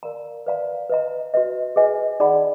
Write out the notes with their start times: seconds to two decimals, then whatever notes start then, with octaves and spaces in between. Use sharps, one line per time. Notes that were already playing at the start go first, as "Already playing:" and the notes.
0.03 A#4 D5 F5 A#5
0.46 B4 D5 F5 A#5
0.90 B4 D#5 A#5
1.34 F#4 B4 D#5
1.76 G#4 B4 D#5 G#5
2.20 D#4 G#4 D5 F#5 B5